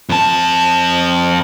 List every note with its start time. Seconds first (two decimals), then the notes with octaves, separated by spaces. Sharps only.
0.09 F2 A5